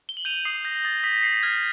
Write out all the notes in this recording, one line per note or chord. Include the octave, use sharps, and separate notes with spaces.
G7
F#7
G6 D#7 F7
D#6 C7
G6 A#6
A#6
D#6 A6
A#6
D#6 B6
D#6 C7
F6 G#6